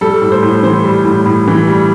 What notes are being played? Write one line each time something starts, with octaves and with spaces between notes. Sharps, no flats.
G3 A4
A2
C5
A2
E3 C5
G3
A2
A2
E3
G3